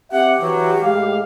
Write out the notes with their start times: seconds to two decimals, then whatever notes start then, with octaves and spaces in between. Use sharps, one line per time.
0.12 C4 G4 E5 F#5
0.41 E3 F#3
0.83 A2 G#3 F5